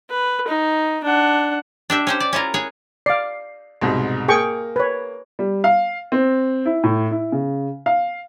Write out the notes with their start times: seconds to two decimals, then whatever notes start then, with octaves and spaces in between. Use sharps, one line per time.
0.10 B4
0.48 D#4
1.04 D4 F#5
1.90 D4 G4 E5
2.07 C#4 G4 C5
2.20 D5
2.33 C#4 E4 F4 A#4
2.54 G#4 C#5 F#5
3.06 D5 F5 C7
3.82 C2 G#2 B2
4.28 A#3 G#4 G5 C#6
4.76 B4 C#5
5.39 G3
5.64 F5
6.12 C4
6.65 E4
6.84 A2
7.11 E4
7.32 C#3
7.86 F5